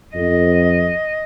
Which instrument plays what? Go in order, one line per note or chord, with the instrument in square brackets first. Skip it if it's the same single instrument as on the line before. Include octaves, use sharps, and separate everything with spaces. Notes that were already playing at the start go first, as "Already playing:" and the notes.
[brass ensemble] F2 [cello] D#5